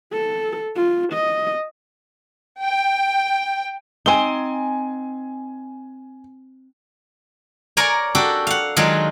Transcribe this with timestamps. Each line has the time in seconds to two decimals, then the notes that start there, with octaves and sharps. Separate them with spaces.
0.13 A4
0.76 F4
1.13 D#5
2.62 G5
4.06 C4 D#4 G#5 G7
7.77 A#4 C#5 D5 G#5 A#5
8.15 D4 F#4 G4 A4
8.47 F5 F#5
8.77 D#3 F#3 G#3 D4 F4